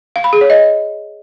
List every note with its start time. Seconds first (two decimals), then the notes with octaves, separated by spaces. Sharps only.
0.16 F5
0.24 B5
0.33 G#4
0.41 C#5
0.50 D#5